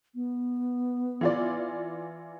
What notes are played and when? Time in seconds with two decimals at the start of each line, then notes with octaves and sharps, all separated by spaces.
0.15 B3
1.21 E3 F4 D5